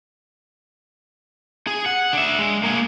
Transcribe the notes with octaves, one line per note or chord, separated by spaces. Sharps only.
G#4
F#5
D4 E5
G#3
A#3 G#4